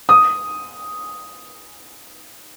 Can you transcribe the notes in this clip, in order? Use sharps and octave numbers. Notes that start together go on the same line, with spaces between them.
D#6